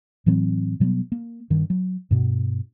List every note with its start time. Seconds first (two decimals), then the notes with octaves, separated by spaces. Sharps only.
0.26 A2 E3 F#3 C4
0.80 B2 F#3 G3 B3
1.12 A#3
1.50 G2 D#3
1.70 F#3
2.11 G2 B2